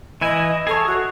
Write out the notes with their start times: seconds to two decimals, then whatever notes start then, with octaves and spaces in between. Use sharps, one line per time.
0.21 E3 E4 D#5 G#5
0.67 G#4 A4 C#5
0.87 F#4